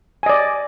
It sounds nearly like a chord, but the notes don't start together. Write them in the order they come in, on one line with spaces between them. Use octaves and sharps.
G#5 D#5 D5